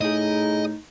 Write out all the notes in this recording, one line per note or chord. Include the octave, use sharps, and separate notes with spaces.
A2 D#4 E4 G#4 D#5